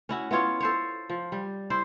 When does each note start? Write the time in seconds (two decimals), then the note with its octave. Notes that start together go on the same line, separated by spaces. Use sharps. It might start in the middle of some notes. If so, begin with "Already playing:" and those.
0.09 C#4 E4 F#4
0.31 B3 E4 F4 C#5
0.60 A4 C5 C#5
1.09 F3
1.32 G3
1.70 E4 C5